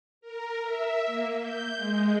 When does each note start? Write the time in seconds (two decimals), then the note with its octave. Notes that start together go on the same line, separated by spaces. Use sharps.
0.21 A#4
0.63 E5
1.06 A#3
1.39 G6
1.76 G#3